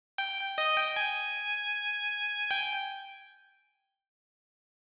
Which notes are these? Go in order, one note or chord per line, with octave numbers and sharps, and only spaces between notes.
G5
D#5
G5
G#5
G5